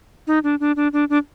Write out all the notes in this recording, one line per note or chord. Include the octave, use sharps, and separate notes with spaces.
D#4
D4
D4
D4
D4
D4